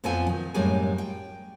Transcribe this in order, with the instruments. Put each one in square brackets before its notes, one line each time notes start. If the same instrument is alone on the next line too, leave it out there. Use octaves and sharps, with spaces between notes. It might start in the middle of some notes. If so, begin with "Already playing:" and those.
[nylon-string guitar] F2 A#2 F3 B3 A4 G#5
D#3
F#2 A2 G3 G#3 A#3 G#5
G5